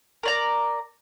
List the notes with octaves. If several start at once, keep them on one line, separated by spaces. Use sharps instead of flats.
A#4 D5 A#5